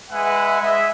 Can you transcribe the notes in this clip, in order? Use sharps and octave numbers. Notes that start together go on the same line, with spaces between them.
G#3 B4 E5 F#5 G#5
G#3 D#5 E5